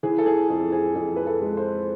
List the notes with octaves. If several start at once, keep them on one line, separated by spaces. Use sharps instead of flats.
E3 G#4
A4
G#4
F2 G#4
G#4
F2 G#4
B4
A4
G#3
C5